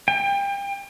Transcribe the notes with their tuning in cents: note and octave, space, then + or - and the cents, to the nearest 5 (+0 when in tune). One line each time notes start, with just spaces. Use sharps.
G5 +30